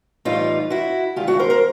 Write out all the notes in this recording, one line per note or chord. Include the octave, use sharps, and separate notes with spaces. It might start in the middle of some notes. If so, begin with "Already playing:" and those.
A2 E3 G3 D#4 F4
E4 F#4
G2 D#3 G#3 F4 G4
E4 F#4
A#4 C5
A#4 C5